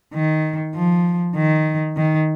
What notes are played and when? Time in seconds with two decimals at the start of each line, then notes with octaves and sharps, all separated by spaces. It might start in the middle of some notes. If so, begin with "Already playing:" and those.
0.14 D#3
0.75 F3
1.35 D#3
1.96 D#3